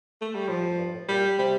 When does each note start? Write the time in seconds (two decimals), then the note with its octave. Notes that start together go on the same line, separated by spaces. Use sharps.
0.22 A3
0.35 G3
0.48 A2 F3
0.63 F2
0.79 G2
0.93 A2
1.09 A#2 G3
1.39 C3 G3